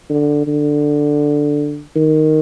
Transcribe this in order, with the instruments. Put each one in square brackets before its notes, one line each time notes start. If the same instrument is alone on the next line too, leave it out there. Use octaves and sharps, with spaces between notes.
[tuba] D3
D3
D#3